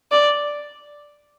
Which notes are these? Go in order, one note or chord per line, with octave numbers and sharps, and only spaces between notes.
D5